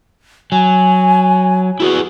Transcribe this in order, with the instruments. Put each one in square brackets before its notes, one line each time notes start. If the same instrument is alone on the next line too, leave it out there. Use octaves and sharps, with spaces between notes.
[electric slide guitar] F#3 [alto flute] G#5
[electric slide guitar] E4 G#4 B4 [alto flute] F#4